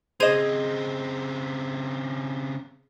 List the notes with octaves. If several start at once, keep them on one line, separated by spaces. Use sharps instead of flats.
C#3 C4 G#4 C5 D#5 G#6 D#7